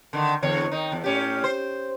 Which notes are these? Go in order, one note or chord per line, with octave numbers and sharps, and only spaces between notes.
D3 D#3
E2 D3 C#5
D#3 D#4
E2
A2 C#4 G4
C5